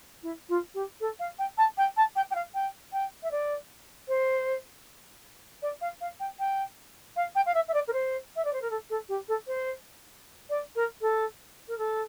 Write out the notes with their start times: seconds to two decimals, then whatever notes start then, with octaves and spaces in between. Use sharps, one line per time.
0.23 E4
0.49 F4
0.74 G4
1.00 A4
1.19 F5
1.38 G5
1.57 A5
1.77 G5
1.96 A5
2.15 G5
2.30 G5
2.35 F5
2.54 G5
2.92 G5
3.23 E5
3.31 D5
4.08 C5
5.62 D5
5.81 F5
6.01 F5
6.19 G5
6.39 G5
7.16 F5
7.35 G5
7.46 F5
7.54 E5
7.68 E5
7.73 D5
7.87 A#4
7.93 C5
8.36 E5
8.44 D5
8.53 C5
8.62 A#4
8.70 A4
8.90 A4
9.08 G4
9.28 A4
9.47 C5
10.49 D5
10.75 A#4
11.01 A4
11.68 A#4
11.78 A4